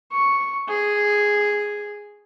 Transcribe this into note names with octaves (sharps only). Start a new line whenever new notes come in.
C#6
G#4